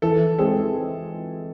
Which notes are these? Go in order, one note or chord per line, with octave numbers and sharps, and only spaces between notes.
E3 A4
G#3 C4 G#4 A4